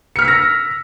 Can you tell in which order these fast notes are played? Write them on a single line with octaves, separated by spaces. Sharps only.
C#7 F6 B6 E6 A#6